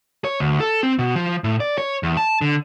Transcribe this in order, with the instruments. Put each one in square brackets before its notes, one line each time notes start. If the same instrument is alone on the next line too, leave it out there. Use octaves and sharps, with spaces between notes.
[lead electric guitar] C#5
D2
A4
C4
B2
F3
A2
D5
C#5
E2
A5
D3